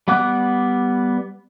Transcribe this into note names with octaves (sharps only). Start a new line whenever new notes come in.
G3 B3 F#5 D6 F#6